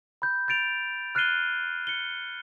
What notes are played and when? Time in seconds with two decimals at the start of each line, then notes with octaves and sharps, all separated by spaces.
0.22 B5 G6
0.48 G6 A6 D7 F7
1.15 F6 F#6 A6 C7 D#7 G7
1.87 C#7 G7